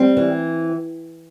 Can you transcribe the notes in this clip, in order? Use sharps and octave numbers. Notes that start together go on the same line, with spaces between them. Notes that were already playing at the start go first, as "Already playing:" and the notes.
Already playing: G3 C4
E3